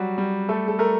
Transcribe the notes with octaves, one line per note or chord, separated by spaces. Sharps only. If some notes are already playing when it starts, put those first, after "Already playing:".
Already playing: F#3 G3 F#4
G3
A3 A4
A4
A3 A#4